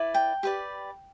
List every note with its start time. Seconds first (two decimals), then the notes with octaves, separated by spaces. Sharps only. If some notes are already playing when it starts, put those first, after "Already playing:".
Already playing: E4 B4 D5
0.14 G5
0.43 G4 B4 D5